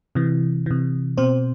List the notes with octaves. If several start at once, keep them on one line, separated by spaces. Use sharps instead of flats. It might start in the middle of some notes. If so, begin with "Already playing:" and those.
C3 E3
C3 E3
B2 C4 C5